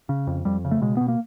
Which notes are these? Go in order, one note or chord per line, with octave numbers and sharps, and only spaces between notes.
C#3
F2
F2 G3
C#3
A3
B2 G#3
B2 B3
A#3